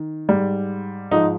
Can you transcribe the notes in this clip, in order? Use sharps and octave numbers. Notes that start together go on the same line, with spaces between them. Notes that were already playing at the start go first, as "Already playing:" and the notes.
Already playing: D#3
G#2 G3
G#2 F3 D#4